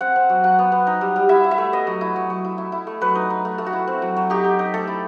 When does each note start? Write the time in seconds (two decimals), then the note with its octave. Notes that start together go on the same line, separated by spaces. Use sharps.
0.01 C4 F#5
0.16 C4
0.29 F#3
0.44 F#3 F#5
0.59 B3
0.72 B3
0.87 D#4
1.01 G3
1.16 G3
1.29 E4 E5
1.44 E4
1.51 E5
1.58 A3
1.73 B3 D#5
1.87 F#3
2.01 E4
2.16 F#3
2.30 F#3
2.45 E4
2.58 E4
2.72 E4
2.87 A3
3.01 F#3 B4
3.15 D#4
3.30 D#4
3.45 A3
3.58 A3
3.66 F#4
3.73 E4
3.88 C4
4.02 F#3
4.17 F#3
4.30 D#4 G4
4.44 D#4
4.59 D#4
4.74 A3 A4
4.87 E4